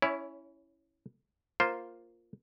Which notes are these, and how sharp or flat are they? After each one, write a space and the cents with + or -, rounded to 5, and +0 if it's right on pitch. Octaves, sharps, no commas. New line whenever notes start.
C#4 +0 E4 +0 C#5 +25
A#3 +0 F4 +0 C5 +0